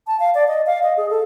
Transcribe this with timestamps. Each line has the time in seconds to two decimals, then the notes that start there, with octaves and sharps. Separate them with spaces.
0.07 A5
0.20 F5
0.35 D5
0.47 D#5
0.66 F5
0.83 D#5
0.97 G#4
1.10 A4